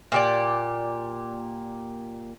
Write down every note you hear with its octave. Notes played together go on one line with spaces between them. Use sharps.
A#2 G4 D5